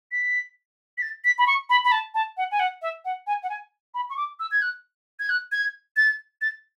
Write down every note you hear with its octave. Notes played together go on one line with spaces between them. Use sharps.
B6
B6
A6
B6
B5
C#6
B5
B5
A5
A5
F#5
G#5
F#5
E5
F#5
G#5
F#5
G#5
B5
C#6
D6
E6
G#6
F#6
G#6
F#6
G#6
A6
A6